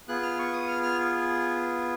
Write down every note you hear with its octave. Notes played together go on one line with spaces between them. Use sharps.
B3 F4 G#4 F#6
F6
C#6
D#6
F6
F6